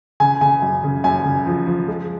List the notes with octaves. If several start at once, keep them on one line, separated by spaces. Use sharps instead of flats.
C#3 G#5
C#3 G#5
F#2
C#3
F#2 G#5
C#3
F3
F3
G#3